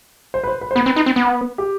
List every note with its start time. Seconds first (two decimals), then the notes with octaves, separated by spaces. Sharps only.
0.34 C5
0.44 B4
0.47 C5
0.61 B4
0.71 C5
0.75 B3 B4
0.86 C4
0.96 D#4
1.06 C4
1.16 B3
1.58 G4